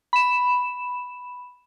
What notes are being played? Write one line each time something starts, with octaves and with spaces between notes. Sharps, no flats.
B5 E7